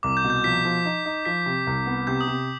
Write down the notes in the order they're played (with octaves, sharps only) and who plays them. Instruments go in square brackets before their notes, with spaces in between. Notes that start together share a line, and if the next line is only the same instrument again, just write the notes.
[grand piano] C2 [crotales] D6
[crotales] G6
[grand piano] B2
[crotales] G6
[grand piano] F3 [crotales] B6
[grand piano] F3
D#4
D#4
[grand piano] F3 [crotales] B6
[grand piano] C3
C2
B3
[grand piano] C3 [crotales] G6
[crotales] D#6
[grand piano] C3